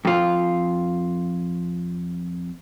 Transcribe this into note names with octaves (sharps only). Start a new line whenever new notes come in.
F2 F4